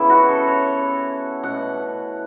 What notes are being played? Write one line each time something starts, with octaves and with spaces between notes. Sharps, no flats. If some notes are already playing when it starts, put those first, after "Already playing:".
Already playing: C#3 E3 B3 E4
F#4
A4
C#5
B2 A3 C#4 F#5